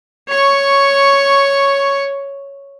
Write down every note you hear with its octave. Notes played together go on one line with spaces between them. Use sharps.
C#5 C#6